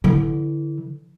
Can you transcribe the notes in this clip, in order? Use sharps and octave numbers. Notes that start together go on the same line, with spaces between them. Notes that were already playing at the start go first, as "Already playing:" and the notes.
D3 E3